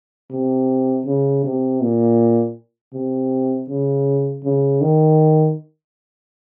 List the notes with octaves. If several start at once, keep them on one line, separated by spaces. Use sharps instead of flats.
C3
C#3
C3
A#2
C3
C#3
C#3
D#3